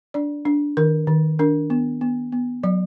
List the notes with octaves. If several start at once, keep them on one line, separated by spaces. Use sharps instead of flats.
D4 D5
D4
D#3 A#4
D#3
D4 A#4
B3
B3
B3
F#3 D5